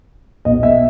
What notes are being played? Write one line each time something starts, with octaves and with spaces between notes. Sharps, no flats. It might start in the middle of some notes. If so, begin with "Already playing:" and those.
B1 B2 D#5
E5